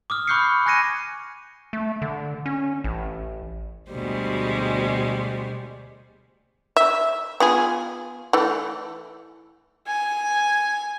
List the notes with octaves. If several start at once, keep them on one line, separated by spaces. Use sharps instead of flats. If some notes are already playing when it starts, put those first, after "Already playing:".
D6 D#6 F6
B5 C#6 F#6 G6 C7 C#7
G#5 F#6 G#6 A#6 C#7 D#7
A3
D3
C#4
A1
D2 B2 G3 G#3 C5
E5
B3 F4 G#4
E3 A3
G#5